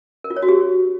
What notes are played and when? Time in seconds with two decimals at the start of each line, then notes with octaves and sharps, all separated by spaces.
0.24 A#4
0.30 F4
0.37 C#5
0.43 F#4
0.49 G4